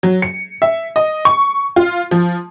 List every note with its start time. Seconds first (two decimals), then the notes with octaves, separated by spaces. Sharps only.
0.03 F#3
0.22 C#7
0.62 E5
0.96 D#5
1.25 C#6
1.76 F4
2.11 F3